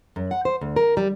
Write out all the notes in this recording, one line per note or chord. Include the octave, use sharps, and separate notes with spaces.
F#2
F#5
C5
D2
A#4
G3